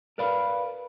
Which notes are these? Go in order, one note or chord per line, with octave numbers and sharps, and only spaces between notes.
A#4 B4 D5 F5 B5